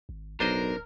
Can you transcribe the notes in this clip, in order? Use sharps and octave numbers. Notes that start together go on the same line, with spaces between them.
G#1
D1 B1 D4 A#4 C5 D#5